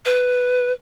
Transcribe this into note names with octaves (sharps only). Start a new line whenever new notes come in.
B4